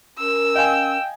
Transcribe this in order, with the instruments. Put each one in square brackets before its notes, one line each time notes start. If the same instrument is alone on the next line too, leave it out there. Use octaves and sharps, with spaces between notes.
[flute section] C#4 A#4 [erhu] E6
[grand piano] D#5 F5 G#5 [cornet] G5